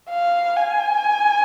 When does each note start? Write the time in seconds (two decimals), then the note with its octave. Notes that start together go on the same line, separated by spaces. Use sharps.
0.10 F5
0.57 G#5